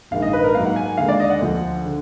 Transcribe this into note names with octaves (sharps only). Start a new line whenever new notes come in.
A#1 G#2 D#3 F5
D#5
B4
A#4
G#2 F#3 A#3 D#4 F5
F#5
G#5
D#2 D3 G#3 F5
D5
D#5
F#5
D2 D3 F3
D3